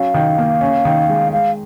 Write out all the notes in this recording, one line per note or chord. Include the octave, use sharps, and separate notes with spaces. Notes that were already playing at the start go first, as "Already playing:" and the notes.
Already playing: F#3 C#4 F5
D#3
A#3
C#4
D#3
G#3
G#3 F5